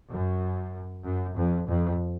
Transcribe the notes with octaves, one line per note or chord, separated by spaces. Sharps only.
F#2
F#2
F2
F2